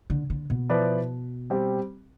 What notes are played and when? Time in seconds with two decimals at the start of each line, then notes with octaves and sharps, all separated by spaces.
0.10 D3
0.30 D3
0.50 B2
0.69 F3 B3 E4 B4 D5
1.50 G3 C4 G4